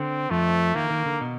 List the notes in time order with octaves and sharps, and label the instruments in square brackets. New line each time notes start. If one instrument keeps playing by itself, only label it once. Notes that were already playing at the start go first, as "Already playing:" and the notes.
Already playing: [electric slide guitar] D3 [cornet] C4
[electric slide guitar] F2 F3 [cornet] A3
[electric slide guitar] D#3 [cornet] A#3
[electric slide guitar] D#3
D3
B2